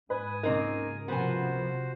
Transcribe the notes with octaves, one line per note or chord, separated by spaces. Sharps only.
G#2 B4 G#5 D#6
C#2 A#3 C4 D#4 A#4
C3 F3 B3 F#4 C5 G#5